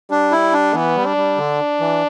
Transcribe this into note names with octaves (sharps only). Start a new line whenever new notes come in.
G3 D4
E4
D4
E3 B3
G3
D4
G3
D3
E3